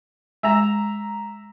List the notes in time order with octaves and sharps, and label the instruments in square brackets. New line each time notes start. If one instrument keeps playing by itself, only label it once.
[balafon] G#3 G#5 [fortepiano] E5 A#5